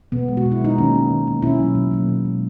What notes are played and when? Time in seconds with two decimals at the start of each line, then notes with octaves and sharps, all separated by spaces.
0.12 B2 B3
0.28 G#3
0.37 F#4
0.46 B2
0.52 E4
0.61 G#3 D#4
0.78 D#3 A#3 C#4
0.95 A#3
1.11 D#3
1.27 A#3
1.42 B2 C#4 E4
1.59 F#3 A#3
1.75 B2
1.91 F#3 A#3
2.09 B2
2.25 G#3